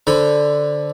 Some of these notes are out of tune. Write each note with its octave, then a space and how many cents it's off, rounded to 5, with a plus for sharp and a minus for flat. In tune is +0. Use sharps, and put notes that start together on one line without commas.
D3 +0 C5 +0 B5 +0